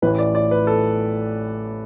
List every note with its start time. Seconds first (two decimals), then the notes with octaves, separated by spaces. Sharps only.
0.02 A1 A2 E3 B4
0.18 D5
0.35 D5
0.51 B4
0.67 A4